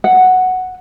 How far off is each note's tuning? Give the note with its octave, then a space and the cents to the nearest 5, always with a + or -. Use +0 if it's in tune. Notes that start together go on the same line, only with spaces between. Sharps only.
F#5 +0